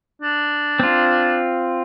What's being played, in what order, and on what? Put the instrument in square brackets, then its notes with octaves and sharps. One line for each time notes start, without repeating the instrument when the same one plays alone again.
[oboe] D4
[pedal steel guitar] C4 F4